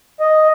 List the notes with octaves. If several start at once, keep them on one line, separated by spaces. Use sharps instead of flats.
D#5